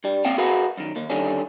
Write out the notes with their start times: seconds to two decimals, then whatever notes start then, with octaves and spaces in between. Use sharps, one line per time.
0.04 G2 G3
0.25 A#3 C4 C#4 F5 G5
0.38 F#4 G#4 A#4 B4 F5 F#5
0.78 F#2 D#3
0.96 D#2 A#3
1.10 D3 D#3 G3 C#4